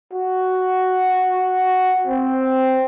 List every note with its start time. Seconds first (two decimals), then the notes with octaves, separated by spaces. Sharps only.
0.13 F#4
2.07 C4